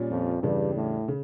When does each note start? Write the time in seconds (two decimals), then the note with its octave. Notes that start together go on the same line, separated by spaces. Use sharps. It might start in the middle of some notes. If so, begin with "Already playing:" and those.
Already playing: A#2 G3 C#4 F4
0.10 F2
0.42 E2 G2 C#3 G3 D4
0.75 A2
1.08 C#3